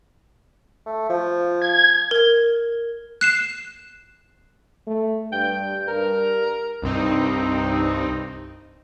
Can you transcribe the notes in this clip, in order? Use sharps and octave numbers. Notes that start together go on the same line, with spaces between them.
A3
F3
G#6
A#4 G#6
F#6 C7 E7
A3
G2 G5
G2 A#4
C2 G2 C4 D#4